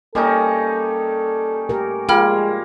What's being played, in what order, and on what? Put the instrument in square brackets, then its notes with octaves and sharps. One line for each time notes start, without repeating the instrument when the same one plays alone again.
[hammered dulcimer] G3 C#4 D#4 [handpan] A#3 A#4 D#5 [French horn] A4
[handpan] A3 G4 A#4
[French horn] G#3 [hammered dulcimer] A#3 [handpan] F4 [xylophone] G5 B5 F6